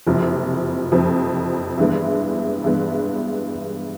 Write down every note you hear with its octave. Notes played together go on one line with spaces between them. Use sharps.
F#1 F2 C3 F3
F#1 F2 C3 F3
G2 E3 G#3 B3
G2 E3 G#3 B3